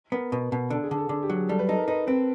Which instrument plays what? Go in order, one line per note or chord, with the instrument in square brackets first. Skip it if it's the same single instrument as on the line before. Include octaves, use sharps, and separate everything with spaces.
[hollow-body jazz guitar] B3 [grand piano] A#4
[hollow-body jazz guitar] B2 [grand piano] B4
[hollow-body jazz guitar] B2
[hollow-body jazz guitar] D3 [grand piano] A4
[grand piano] G#4
[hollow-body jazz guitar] D3
[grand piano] A4
[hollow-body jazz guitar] D3 [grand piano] G#4
[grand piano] G4
[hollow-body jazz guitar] F#3
[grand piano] G#4
[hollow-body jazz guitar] G3 [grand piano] A4
[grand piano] B4
[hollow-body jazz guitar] D#4 [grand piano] A4
[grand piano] A#4
[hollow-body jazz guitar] D#4 [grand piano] B4
[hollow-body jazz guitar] C4 [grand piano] B4